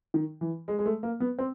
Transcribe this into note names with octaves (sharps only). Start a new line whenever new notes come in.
D#3
E3
G#3
G#3
A3
A#3
B3
C4